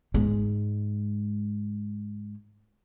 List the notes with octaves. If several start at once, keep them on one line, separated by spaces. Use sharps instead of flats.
G#2 G#3